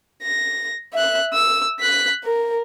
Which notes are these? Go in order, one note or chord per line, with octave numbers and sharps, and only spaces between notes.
A#6
E5 F#6
E6
F#6 B6
A#4